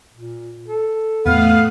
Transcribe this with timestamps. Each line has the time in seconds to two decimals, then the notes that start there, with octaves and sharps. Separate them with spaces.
0.14 A#2
0.68 A4
1.26 E2 A2 A3 B3 F5 D#6 F#6